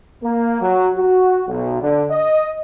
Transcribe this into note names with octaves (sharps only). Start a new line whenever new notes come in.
A#3
F#3
F#4
B1
D3
D#5